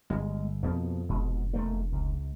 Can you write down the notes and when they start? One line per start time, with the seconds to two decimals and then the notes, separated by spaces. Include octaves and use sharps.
0.10 G1 G#3
0.63 F2 B2 F3 A#3
1.09 F1 G#2 B2
1.53 E1 A3 A#3
1.92 C#2